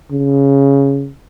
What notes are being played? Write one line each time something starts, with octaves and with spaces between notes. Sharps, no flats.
C#3